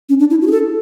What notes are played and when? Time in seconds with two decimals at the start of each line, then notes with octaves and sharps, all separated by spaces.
0.09 C#4
0.19 D4
0.30 E4
0.42 F#4
0.47 G#4
0.51 A4